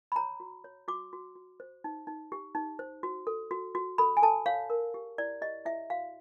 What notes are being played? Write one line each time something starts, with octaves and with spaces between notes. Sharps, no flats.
B5
C#5 A#5
F#4
C#5
F#4 D6
F#4
F#4
C5
D#4
D#4
G4
D#4
C5
F#4
A4
F#4
F#4
A4 B5
G#5
A4 A5
C#5 F5
A#4
G4
E4 D5
G4 D#5
E4 E5
F#4 F5